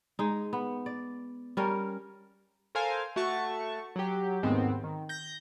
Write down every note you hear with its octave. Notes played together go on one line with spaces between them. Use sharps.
G#3 D#4
B3
D5
G3 C#4 A#4
A4 A#4 C5 F5 G#5
A3 F#4 A5 C#6
F#3 G4
D#2 G#2 D#3 G#3 B3 C4
D#3
G6 A#6